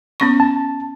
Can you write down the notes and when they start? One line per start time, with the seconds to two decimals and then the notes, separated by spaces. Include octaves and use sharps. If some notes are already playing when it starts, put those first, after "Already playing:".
0.20 B3 C#4 C#6
0.40 A5